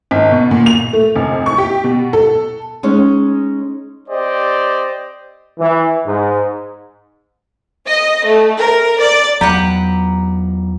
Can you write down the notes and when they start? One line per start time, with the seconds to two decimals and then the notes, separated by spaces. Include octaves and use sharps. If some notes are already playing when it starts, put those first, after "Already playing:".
0.11 G#1
0.31 B2
0.51 A#2
0.66 F7
0.93 A3
1.15 F1
1.46 C#6
1.58 G4
1.84 B2
2.13 A4
2.83 G#3 C#4 D#4
4.08 C4 G4 C5 D5 D#5
5.59 E3
6.04 G#2
7.87 D#5
8.26 A3
8.59 A#4
9.00 D5
9.41 E2 F#3 G4 B4 F#5 A#5